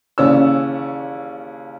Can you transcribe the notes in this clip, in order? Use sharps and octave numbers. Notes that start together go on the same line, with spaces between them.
D#2 C#3 E3 C#4 D5 E6